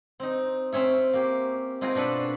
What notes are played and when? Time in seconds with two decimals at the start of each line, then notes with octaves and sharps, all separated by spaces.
0.20 C4 D#4
0.72 C4 C#4 C#5 E5
1.13 A#3 G4
1.81 C4 D#4 F4 F#4 G#4 A#4
1.95 B2 D4 A4 B4